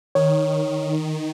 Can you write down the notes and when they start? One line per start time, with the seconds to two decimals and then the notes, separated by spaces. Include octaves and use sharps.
0.15 D#3 C#5